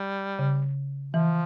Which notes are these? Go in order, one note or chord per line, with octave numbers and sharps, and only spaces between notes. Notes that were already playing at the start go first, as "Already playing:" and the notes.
Already playing: G3
C#3
E3 F3